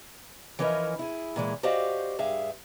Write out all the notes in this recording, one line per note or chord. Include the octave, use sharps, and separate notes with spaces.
E3 F3 C#4 E4 A#4 D#5
E4 G#4
A#2 E3 G#3
F#4 G4 C5 D5 D#5 F5
G2 G#4 E5 F5